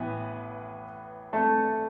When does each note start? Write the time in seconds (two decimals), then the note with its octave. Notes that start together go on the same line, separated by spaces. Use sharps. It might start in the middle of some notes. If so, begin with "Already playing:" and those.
Already playing: A1 A2 E3 B3 B4
1.33 A3 A4